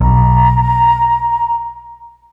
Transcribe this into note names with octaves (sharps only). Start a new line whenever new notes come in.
B1 A#5